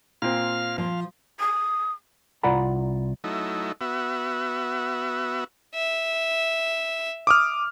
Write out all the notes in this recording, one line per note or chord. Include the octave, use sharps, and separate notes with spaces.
A#2 C4 F5 F6
F3 F5
D#6
C2 F4 D5 F#5 A#5 B5
F#3 A3 D#4 E4
B3 F#4 E5
E5
D6 D#6 F6